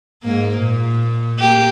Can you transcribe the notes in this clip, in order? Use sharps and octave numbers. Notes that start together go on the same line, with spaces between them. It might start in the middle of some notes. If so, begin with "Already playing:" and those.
G#2 A#3
A#2
A#3 G4